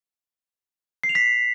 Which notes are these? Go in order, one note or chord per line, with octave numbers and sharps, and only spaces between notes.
C7
F7
B6